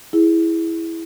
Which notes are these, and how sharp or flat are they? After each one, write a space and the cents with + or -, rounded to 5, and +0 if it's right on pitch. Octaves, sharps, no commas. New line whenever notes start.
E4 +0 G#4 +0